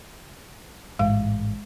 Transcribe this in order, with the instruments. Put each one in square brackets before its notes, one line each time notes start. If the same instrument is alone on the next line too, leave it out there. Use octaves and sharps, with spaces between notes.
[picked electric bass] A1 G#2 [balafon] G#3 F5